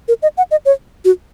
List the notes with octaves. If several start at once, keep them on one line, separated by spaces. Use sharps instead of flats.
A#4
D#5
F#5
D#5
C#5
F#4